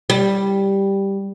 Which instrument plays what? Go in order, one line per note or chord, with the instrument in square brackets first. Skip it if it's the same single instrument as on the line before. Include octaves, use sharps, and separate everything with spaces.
[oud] G3